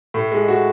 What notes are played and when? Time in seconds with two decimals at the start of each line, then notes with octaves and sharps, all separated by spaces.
0.14 A2
0.32 G#3
0.48 F#4